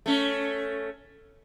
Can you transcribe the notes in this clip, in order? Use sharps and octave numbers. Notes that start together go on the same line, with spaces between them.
A3 C#4